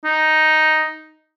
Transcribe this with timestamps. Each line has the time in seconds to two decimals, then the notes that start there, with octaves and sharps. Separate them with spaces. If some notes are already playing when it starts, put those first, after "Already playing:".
0.04 D#4